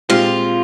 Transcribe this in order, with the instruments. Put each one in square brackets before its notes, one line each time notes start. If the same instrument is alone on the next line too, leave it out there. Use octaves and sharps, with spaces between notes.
[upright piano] A#2 G#3 C4 G4 [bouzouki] F4